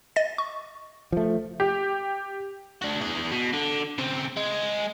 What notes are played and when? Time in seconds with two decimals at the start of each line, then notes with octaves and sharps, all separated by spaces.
0.16 D#5 A6 A#6
0.38 C#6
1.12 F3 A3
1.60 G4
2.82 D4 F#4
3.01 B3 G#4
3.32 B2
3.53 D3
3.98 C#3 C4
4.37 G#3